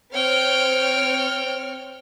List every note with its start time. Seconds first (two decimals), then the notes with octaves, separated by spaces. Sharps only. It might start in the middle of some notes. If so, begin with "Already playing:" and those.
0.14 C4 C#5 G5 F6